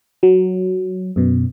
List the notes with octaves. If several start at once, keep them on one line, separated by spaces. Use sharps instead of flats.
F#3
F#2 B2